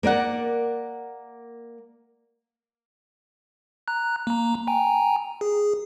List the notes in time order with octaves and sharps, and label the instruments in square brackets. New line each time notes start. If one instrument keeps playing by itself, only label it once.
[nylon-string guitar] A#3 A#4 D5 F#5
[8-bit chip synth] A#5 F#6
A#3 A#5
G5 G#5 A#5
G#4